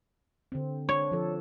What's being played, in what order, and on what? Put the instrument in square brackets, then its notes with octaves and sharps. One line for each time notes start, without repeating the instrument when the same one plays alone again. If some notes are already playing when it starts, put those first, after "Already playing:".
[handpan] D3 C4
[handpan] D4 [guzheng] C#5
[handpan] F3 A4